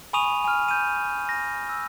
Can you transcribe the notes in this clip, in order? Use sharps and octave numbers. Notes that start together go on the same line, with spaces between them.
G#5 B5 C#6 D#6 D#7 F7
G#5 F6
G6 D#7
A#6
E6